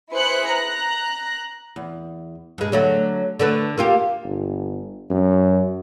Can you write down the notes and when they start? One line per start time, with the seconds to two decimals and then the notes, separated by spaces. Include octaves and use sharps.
0.13 E4 G#4 B4 C5 F#6 C#7
0.48 A#5 F#6
1.76 E2
2.58 G2 G#3
2.72 D3 F#3 A3
3.39 D3 A3 B4
3.78 A#3 F4 G4
4.24 G1
5.10 F#2